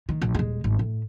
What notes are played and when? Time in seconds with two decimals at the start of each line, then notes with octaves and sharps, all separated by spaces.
0.09 D#3
0.22 A#1
0.35 D#1 G#3
0.64 G#1
0.79 A2